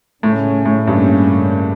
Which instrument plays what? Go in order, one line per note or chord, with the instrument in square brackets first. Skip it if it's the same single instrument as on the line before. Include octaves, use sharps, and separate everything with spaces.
[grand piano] A2 [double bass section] C#3 G3 C#4
[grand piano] A2
[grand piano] G2 [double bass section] C#3 G3 A#3 C#4